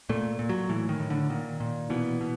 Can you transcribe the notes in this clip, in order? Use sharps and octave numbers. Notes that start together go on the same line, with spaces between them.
A#2 A3
A#2
F#3
A2 E3
D#3
A2
D3
A#2 D#3
A#2
B2 E3
B2